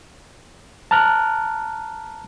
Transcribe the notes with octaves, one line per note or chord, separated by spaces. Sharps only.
A5 A#5 F6 F#6